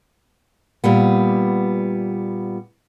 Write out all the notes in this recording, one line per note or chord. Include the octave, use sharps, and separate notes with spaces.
A#2 G3 B3